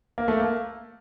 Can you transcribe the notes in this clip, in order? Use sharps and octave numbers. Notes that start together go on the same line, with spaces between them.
A#3
A3
A#3